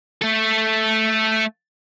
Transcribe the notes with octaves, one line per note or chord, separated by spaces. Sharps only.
A3 A4